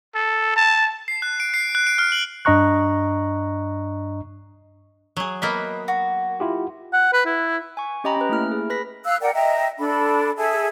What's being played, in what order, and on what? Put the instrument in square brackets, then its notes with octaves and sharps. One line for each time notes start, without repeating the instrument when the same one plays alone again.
[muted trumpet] A4
A5
[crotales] C7
F#6
D7
C7
F#6
D7
F6
F#7
[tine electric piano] G2 D4 D#5 A#5 C#6 F#6
[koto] F#3 G#4
[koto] A#3 B3 E5 [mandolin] D#5 B5
[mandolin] F#4
[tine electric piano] E4 F4 G4
[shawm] F#5
B4
E4
[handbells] G#5 C#6
C#4 G4 D#5 G5 A#5 B5
C#4 B4
A3 A#3 E4 F6
G#4
B4 B5 A#6 B6
[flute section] F5 E6 F#6
A#4 D5 F#5 G5
D#5 E5 G5 A#5
D4 A4 B5
G#4 A4 E5